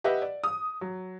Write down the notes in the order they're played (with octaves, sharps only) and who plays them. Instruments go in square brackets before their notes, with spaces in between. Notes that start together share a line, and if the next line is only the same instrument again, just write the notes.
[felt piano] G4 B4 D#5 E5 F#5
D5
D#6
F#3